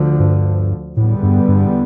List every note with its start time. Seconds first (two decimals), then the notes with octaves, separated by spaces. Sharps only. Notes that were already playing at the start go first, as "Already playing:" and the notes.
Already playing: D2 D3 F3
0.19 G2
0.97 E2 A2 D3 G3 B3
1.23 G2
1.48 G2